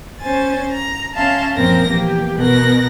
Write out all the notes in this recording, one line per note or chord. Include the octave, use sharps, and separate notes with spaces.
C#4 C5 G#5 A6
A#5
C#4 E5 F5 A5 A#5 C6
F#2 A#2 F3 C4 A#4 A#6
E2 A#3 G4
B2 B3 A#4 F#6 A#6